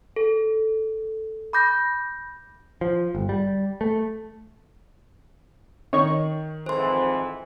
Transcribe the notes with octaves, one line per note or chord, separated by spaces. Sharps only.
A4
B5 D6 G6 A#6
F3
G1
G3
A3
D#3 C#5 D#5 C#6
F2 G#2 E3 C5 C6